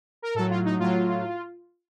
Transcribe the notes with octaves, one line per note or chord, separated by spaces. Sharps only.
A#4
A2 F#3 A4
F4
D#4
A2 F#3 F4